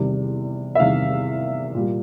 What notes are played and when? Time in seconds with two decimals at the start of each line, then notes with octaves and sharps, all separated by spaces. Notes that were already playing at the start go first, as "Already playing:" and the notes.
Already playing: E2 C3 D#3 G3
0.75 E5
0.79 E2 C3 D#3 G3 F5
1.75 A#2 G3